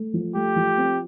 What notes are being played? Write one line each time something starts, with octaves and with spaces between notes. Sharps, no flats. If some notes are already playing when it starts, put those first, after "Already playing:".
Already playing: A3
F3
A3 G4
F3
C4